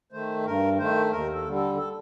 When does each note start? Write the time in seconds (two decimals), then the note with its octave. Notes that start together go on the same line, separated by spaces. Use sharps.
0.12 D#3 A3 C5
0.45 G2 A#4
0.78 D#3 A3 C5
1.12 D#2 A#4
1.33 A4
1.45 D3 G3
1.55 A4
1.77 A4